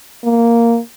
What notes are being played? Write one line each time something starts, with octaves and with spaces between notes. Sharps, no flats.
A#3